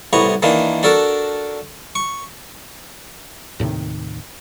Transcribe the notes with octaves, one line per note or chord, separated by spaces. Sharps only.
C2 A2 B3 A#5 C#6
D#3 E3 A#3 D4
D4 F#4 A4 A#4
C#6
D#2 A2 C3 D#3